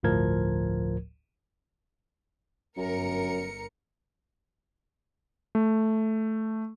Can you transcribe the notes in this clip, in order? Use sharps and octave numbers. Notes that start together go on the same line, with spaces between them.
G1 D2 A2 F3 A#4 G#6
G1 F#2 A#4 C#7
A3